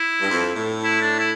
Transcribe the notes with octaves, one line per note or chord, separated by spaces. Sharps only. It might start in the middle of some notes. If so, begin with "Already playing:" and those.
Already playing: E4
G2
F2
A2
E4
D4
E4